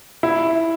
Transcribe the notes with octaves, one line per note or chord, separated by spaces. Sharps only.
E4